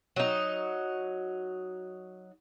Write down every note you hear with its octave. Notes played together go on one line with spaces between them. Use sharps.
F#3 D#4